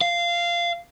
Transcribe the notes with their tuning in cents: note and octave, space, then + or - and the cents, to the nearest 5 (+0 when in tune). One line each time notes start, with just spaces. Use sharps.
F5 -15